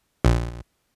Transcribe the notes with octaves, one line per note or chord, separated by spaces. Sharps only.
A#1